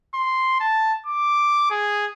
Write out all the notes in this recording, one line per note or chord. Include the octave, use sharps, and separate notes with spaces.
C6
A5
D6
G#4